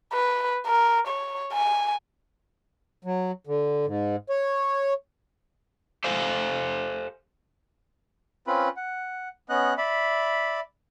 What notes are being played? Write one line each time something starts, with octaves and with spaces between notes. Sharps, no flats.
B4
A#4
C#5
G#5
F#3
D3
G#2
C#5
G4 A4 C5 F5 G#5
C4 C#4 F4 B4 B5
F#5
B3 C#4 D#5 F#6
D5 E5 B5